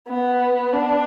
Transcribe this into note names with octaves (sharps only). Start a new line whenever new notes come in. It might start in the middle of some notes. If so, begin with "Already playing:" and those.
B3
D4